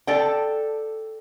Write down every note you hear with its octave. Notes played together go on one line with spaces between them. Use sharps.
A4 D5 G5